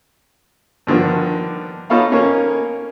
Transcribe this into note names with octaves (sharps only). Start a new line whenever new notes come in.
G2 D3 D#3 F3
D#4 F4 A4 C#5 F5 B5
A#3 C#4